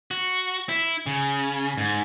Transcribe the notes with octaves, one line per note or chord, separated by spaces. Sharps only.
F#4
E4
C#3
G#2